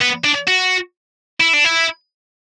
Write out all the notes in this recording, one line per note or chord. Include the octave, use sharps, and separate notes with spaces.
B3
D4
F#4
E4
D4
E4